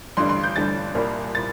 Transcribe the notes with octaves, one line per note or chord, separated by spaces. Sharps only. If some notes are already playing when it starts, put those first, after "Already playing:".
A1 G2 D3 G3 C6
C6
G6
A1 G2 D3 G3 A6
C2 A#2 G3 A#3
A#2 A6